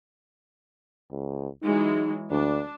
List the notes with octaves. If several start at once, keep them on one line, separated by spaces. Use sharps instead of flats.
C#2
E3 F#3 G#3 D#4
D2 D4